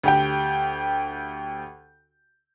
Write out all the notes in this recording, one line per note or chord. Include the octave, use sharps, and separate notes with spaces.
D2 G4 G5